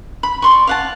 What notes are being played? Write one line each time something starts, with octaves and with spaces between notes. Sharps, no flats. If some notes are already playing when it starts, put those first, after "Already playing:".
B5
D5 C6 C#6
F5 F#5 A5